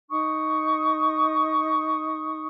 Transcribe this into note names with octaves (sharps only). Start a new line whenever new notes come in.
D#4 C#6 D#6